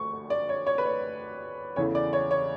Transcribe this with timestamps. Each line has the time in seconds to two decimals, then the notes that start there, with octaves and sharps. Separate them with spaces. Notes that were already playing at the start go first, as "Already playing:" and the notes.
Already playing: D2 D3 C#6
0.30 D5
0.49 C#5
0.67 C#5
0.78 B4
0.86 C#5
1.76 E2 C#3 E3 A3 C#5
1.95 D5
2.13 C#5
2.31 C#5